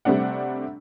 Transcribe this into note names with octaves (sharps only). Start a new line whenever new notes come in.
C3 G3 A3 C4 D4 F#5